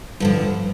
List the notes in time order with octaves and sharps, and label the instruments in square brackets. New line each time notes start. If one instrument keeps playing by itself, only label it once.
[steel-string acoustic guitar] G2 D3 F3